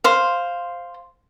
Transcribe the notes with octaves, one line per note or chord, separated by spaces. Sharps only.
C5 F5